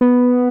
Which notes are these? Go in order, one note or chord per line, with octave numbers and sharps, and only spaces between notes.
B3